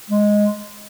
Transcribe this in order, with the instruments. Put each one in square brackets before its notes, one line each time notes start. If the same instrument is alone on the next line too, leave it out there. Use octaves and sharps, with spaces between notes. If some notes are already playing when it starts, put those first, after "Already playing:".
[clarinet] G#3